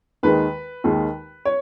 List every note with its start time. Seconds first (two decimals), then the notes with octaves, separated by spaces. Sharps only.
0.23 D#2 D#3 G#3 B4
0.84 D#2 D#3 G#3
1.45 C#5